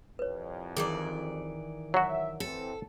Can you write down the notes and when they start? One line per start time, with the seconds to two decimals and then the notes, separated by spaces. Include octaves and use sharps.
0.19 C2 F2 B4 C#5
0.76 D#3 E3 G#4 D5 A#5 D6
1.94 F#3 F#4 C#5 E5 F#5
2.40 E3 C4 A4